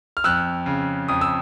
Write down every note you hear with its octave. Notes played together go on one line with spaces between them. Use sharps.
F6
F2 E6 F#6
C#3
F2 D#6
E6